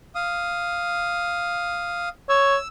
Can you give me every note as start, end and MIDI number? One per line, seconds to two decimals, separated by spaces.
0.15 2.09 77
0.15 2.09 87
2.29 2.57 73
2.29 2.68 88